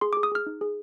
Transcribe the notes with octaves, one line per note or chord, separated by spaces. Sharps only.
G#4 C6
G#4 D6
D#6
G#4 F6
D#4
G#4